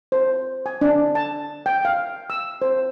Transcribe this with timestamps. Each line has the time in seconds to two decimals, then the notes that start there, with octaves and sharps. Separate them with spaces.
0.12 C5
0.66 G#5
0.81 D4
1.15 A5
1.66 G5
1.85 F5
2.30 E6
2.62 C5